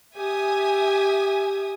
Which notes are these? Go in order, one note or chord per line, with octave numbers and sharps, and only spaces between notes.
G4 E5 G#5 D#6